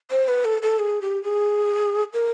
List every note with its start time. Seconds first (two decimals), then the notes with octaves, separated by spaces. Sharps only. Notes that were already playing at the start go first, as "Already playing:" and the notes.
0.11 C5
0.28 B4
0.45 A4
0.62 A4
0.79 G#4
1.02 G4
1.23 G#4
2.13 A#4